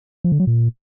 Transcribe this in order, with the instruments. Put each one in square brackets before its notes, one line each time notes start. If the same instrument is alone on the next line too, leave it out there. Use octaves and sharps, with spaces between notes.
[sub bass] F3
D3
F#3
A#2